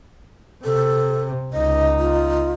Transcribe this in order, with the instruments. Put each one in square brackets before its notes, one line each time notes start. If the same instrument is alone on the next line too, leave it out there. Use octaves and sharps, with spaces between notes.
[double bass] C3 [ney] A4
[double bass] C#2 D#4 [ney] D#5
[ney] F4